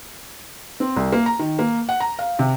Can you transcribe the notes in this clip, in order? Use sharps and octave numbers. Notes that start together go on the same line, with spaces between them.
C4
C2
A#3
A#5
D#3
A#3
F#5
A#5
F5
C3